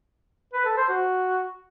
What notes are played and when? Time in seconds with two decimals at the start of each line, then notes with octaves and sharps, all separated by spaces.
0.53 B4
0.65 A4
0.77 C5
0.89 F#4